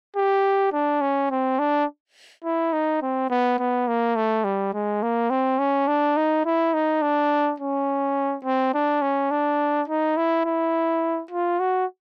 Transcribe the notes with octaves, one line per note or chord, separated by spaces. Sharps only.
G4
D4
C#4
C4
D4
E4
D#4
C4
B3
B3
A#3
A3
G3
G#3
A#3
C4
C#4
D4
D#4
E4
D#4
D4
C#4
C4
D4
C#4
D4
D#4
E4
E4
F4
F#4